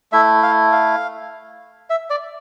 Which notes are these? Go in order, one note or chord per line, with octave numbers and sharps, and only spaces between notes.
A3 E4 E5
F5
F5
E5
D5